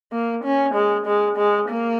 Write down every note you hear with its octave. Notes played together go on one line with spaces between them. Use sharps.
A#3
C#4
G#3
G#3
G#3
A#3